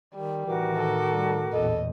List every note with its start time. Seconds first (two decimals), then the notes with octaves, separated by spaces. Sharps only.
0.14 D#3 G3
0.46 A2 D#3 E3 F#4 A#4 D6
0.76 A4
1.09 G3
1.52 A1 E2 A#2 A4 D#5